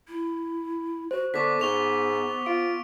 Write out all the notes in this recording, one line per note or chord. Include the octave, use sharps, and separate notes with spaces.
E4
F#4 C5
D3 B3 C#6 D6 B6
G#2 B3 C#6 F7 G7
F4 D7